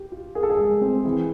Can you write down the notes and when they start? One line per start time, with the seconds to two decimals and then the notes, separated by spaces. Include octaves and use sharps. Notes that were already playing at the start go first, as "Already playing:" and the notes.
Already playing: G4
0.12 F4
0.35 G#4 A#4
0.43 A4
0.50 G#4
0.59 G#3
0.81 C4
1.05 E3 G#4